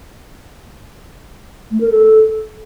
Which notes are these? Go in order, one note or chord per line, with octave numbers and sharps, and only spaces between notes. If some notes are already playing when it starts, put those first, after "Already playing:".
A3
A#4
A4